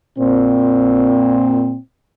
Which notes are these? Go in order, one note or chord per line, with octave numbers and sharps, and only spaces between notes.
A#2 C4